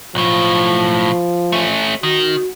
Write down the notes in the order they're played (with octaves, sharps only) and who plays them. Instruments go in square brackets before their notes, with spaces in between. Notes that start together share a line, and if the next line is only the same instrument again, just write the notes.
[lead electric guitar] B1 A2 [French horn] F3
[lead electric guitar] A3 C#4
[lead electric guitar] D#3 [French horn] F#4